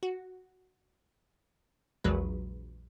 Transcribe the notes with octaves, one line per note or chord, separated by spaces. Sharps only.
F#4
A#1 E2 F#3 G#3 B4